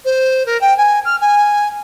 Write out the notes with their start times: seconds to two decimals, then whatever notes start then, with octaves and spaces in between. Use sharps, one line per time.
0.05 C5
0.46 A#4
0.61 G5
0.77 G#5
1.05 F6
1.21 G#5